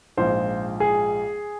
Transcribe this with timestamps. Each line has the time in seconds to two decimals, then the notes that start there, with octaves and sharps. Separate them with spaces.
0.17 A#1 G#2 F3 C5
0.80 G#4